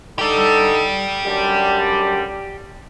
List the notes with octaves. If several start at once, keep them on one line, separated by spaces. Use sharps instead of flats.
D3 D#4 G4 A4 D5
F#2 D3 G3